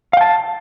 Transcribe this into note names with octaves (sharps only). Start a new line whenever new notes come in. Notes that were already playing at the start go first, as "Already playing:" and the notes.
F5 G5 A5